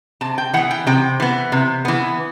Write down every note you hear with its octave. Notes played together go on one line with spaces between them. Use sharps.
C3 A5
G5
E3 B3 F#5
G5
C3 G5
E3 B3
C3
E3 B3